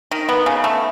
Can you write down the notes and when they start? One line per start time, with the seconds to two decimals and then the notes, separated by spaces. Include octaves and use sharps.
0.11 D#3
0.29 B3
0.46 C#3
0.64 A3